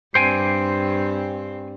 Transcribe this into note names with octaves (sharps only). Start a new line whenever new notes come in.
G2 C4 C5 G5 G#5